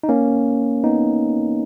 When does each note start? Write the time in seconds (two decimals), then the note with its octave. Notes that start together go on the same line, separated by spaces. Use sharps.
0.03 D#4
0.09 A#3 C#4
0.84 B3 D#4